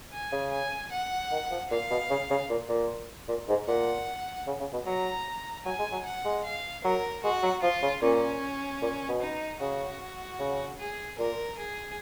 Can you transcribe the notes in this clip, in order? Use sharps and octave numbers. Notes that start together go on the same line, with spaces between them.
G#5
C#3
G#5
F#5
D#3
F3
A#2 F5
B2
C#3
C#3
A#2
A#2
A#2
G#2
A#2 F#5
C#3
C#3
B2
F#3 A#5
F#3 G#5
G#3
F#3
F#5
G#3
F5
F#3 A#4
G#3 F#4
F#3
F3 F4
C#3
A#2 C#4
A#2
B2
D#4
C#3 F#4
C#3
G#4
A#2 A#4
G#4